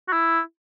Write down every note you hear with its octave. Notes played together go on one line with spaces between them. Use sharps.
F#4
E4